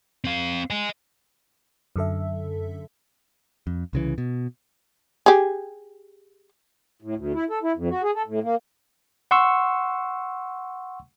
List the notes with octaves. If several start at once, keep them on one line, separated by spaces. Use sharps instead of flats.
C4 F5
D#5 G#5
F#2 D3 A4 E5
F2
C2 C#3 E3
B2
G4 G#4
A2
D2
E4
A4
E4
F2
F#4
G#4
A4
A2
A#3
F#5 C6 C#6 E6